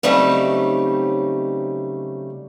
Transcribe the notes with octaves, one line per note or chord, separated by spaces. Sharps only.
C#3 F#3 G3 A3 C4 D#4